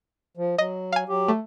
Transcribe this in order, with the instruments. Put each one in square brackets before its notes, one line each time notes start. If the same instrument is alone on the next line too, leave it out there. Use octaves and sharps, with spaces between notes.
[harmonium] F3
[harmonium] F#3 [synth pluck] D#5
[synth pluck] F5 G#5
[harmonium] F#3 G4
[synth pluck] A3